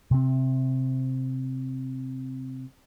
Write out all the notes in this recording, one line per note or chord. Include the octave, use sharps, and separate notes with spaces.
C3 C4